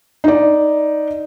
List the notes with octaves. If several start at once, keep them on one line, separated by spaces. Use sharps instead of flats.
D#4 D5